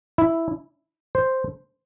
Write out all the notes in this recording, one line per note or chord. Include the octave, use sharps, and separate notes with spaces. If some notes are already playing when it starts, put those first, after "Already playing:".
E4
C5